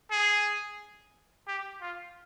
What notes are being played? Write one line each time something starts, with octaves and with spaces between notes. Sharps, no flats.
G#4
G4
F4